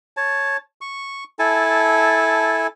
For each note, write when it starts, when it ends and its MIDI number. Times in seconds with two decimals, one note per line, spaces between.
0.17 0.57 73
0.17 0.57 81
0.81 1.24 85
1.39 2.67 64
1.39 2.67 69
1.39 2.67 80
1.39 2.67 81